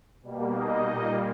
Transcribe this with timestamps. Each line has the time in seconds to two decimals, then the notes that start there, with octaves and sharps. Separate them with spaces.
0.22 B2 G3 A#3
0.52 D#4 D#5
0.83 A#2 G3 A#3